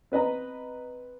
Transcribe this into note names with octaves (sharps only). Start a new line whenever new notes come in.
C4 B4 D#5 A#5